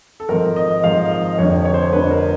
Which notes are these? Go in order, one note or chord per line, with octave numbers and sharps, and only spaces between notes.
A4
G#1 G#2 F3 A#4
D#5
G#1 G#2 F3 F5
D#5
F1 F2 D3 C#5
C#5
C5
C#5
F1 F2 D3 B4
A#4